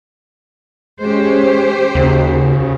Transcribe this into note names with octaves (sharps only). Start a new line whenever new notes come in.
G#3 C#4 G4 C5
D#2 C#3 F#4